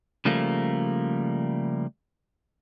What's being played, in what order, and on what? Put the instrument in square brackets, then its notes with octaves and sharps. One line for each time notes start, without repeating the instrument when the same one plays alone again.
[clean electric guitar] C#3 F3 G3 A3 A#3